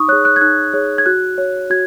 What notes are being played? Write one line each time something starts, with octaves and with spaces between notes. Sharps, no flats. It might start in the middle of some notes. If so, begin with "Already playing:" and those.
Already playing: D#4 C#6 D#6
G#4 C#5 F#6
F#6
G#6
D#4 F#6
G#4 C#5
G#6
F#4 F#6
C#5
F#4 G#6